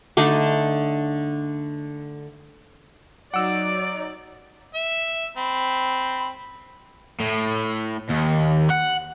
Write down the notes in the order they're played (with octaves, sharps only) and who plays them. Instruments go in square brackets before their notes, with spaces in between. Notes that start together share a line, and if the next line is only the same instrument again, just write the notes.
[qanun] D3 A3 D4 D#4
[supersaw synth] F#3 D#4 [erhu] D5 [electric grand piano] F#5 E6 [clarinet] D6
[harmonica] E5
C4 B5
[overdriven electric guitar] A2
D#2
F#5